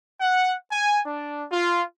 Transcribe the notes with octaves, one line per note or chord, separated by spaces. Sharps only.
F#5
G#5
D4
F4